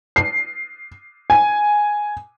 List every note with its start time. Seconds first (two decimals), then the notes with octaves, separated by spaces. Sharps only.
0.16 C7
1.30 G#5